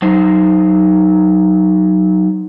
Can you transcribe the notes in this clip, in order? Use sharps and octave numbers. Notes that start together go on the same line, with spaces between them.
F#3 D#4 C5